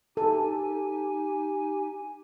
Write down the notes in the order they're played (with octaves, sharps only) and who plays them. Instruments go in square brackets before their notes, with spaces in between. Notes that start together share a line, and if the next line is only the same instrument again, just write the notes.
[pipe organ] D#4 G4 G#5 [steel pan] A4